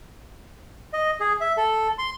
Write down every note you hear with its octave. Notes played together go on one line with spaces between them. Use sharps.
D#5
G#4
E5
A4
C6